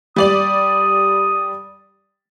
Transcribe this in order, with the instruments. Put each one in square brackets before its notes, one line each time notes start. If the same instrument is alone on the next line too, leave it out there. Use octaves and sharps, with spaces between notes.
[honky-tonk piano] G3 D5 F#7 [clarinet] D#6